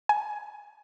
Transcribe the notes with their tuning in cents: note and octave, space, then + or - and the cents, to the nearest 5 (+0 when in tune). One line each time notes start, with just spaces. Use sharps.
G#5 +15